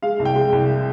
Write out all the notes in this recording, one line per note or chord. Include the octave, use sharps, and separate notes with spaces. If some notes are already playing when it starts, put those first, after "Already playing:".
G#3 F5
C2
G5
G#3
C2